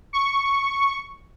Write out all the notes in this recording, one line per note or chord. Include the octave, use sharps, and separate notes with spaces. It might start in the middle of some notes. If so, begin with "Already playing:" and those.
C#6